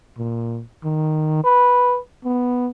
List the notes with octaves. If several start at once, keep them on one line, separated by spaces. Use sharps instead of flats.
A#2
D#3
B4
B3